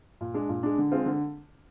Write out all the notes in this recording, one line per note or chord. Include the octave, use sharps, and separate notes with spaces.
A#2
G#3 D4
A#2
G#3 D4
D3
G#3 C4 F4
D3